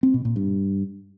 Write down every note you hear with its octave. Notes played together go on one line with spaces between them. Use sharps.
C4
B2
A#2
G2